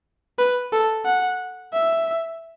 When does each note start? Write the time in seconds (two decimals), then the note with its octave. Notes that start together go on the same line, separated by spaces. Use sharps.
0.39 B4
0.73 A4
1.05 F#5
1.73 E5